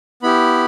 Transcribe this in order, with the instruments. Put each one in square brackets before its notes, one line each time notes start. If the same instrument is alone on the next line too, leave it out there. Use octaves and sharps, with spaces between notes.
[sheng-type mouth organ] B3 E4 G4 B5